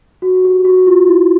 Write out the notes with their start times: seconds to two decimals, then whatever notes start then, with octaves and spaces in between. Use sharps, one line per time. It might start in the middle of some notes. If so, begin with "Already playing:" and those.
0.22 F#4
0.44 G4
0.65 F#4
0.87 F4
1.08 E4